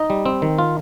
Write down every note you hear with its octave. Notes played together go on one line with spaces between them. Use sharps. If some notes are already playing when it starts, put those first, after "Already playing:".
Already playing: D#4 D#5
G3
C4
D#3
F4